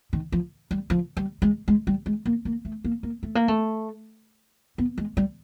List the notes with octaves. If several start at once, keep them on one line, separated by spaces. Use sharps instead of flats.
D#3
F3
G3
F3
G3
G#3
G#3
G3
G#3
A#3
A#3
A3
A#3
A#3
A3
A#3
A3
B3
G#3
G3